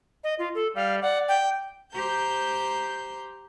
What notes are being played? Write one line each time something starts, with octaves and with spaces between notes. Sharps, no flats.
D#5
F4
A4
G3 F5
D5 F#5
G5
G4 C5 A#5 G6